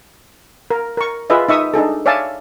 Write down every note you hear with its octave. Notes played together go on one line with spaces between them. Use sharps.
A#4
A#4 C#6
F4 G#4 B4 D#5 E5
D#4 E5 C#6 D#6
D4 D#4 G#4 A4
C#5 D5 E5 F5 G#5 A5